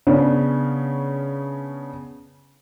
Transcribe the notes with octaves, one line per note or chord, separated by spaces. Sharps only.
C#3 B3 C#4 D4